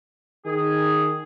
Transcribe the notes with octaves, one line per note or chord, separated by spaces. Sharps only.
D#3 G#4